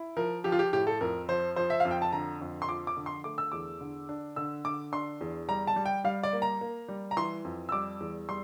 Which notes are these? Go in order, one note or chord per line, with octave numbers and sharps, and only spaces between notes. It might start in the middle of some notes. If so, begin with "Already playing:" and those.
Already playing: E4
F3 A#4
F3 G4
F4
G4
A2 G4
A4
F2 A#4
F3 C5
F3 C5
E5
F2 F5
G5
A5
D3 A#5
F2
C6
F3 D6
D6
D3
C6
A3 D6
E6
E2 D6
D3
D4
D3 E6
D3 D6
D4 C6
E2
G3 A#5
A5
G3
G5
G3 F5
D5
A#3
A#5
A#3
G3
A#5
E3 C6
F2
E6
G3 D6
E2
G3 C6